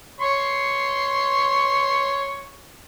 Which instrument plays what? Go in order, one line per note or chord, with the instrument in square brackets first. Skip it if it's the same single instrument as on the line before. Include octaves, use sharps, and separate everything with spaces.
[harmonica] C#5 C6 C#6